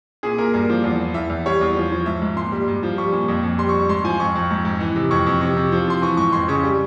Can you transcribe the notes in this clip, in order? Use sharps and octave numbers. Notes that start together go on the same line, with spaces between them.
A#2 G#4
A#2 A#4
G2 A#4
F3
E2
E3
E2 E5
E2
G3 C#5
E2
F3
F3
G#2 E5
G#2
A#2 C6
G3
G2
F3
G3 C#6
A#2
F2
F2
G3 C6
C#6
G3
C#6
G#2 C6
F3 G#5
F2 C#6
F2
G#2
G#2
E3
C3
F2 C#6
F2
C3 C#6
C3
F3
F3 C6
E3 C#6
G#2 C#6
F2 C6
C#3 C#6
G3